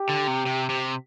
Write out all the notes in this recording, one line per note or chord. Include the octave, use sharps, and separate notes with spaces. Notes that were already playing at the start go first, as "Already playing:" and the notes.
Already playing: G4
D3
C3
C3
C3